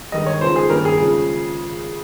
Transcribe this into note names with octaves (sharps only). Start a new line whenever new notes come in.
G2 D#3 G#3 D#5
C#5
C#3 F3 G#3 D#4 C5
G#4
G2 D#3 A#3 C#4 A#4
G#4
C#3 F3 G#3 C#4